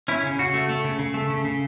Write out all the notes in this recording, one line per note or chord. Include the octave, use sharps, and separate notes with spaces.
C#4 E4
C#3
C#3 F#4
A3
A3
C#3
C#3
A3
C#3
C#3